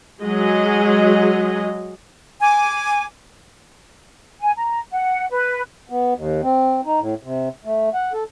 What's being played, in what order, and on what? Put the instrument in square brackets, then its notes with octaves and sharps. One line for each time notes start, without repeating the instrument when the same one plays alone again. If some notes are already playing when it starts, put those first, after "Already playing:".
[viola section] F#3 G#3 G#4 D#5
[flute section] G#5 D6
G#5
A#5
F#5
B4
[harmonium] B3
D#2
C4
D#4
A2
C3
A3
F#5
A4